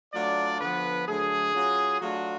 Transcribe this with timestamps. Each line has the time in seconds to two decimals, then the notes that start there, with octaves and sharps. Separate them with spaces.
0.14 F#3 A3 D4 F4 D5
0.61 D3 F3 B3 B4
1.08 D3 F#3 A3 G#4
1.54 F#3 C#4 F4
2.01 F#3 A3 D4 F4 F#4